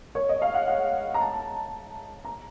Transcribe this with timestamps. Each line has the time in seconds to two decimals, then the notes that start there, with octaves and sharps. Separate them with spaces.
0.15 C#5
0.29 D#5
0.42 F5
0.54 F#5
0.68 F#5
1.14 A#5
1.21 A5
2.25 A#5